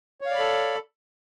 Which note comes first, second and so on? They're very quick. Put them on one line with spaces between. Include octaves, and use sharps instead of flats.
C#5 F5 D5 B5 A4